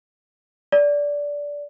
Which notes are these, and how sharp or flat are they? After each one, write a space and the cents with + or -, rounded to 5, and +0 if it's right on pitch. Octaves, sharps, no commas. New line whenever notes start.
D5 -15